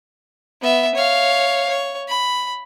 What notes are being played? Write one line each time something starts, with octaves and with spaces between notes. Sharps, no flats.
B3 E5
C#5 F5
C#5
B5